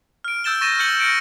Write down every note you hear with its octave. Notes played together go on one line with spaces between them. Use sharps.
F6 D7
E6 G6 A6 E7 G7
C#6 A6 A#6 D#7 E7
F6 G6 C#7 F#7
F6 A#6 C#7 D7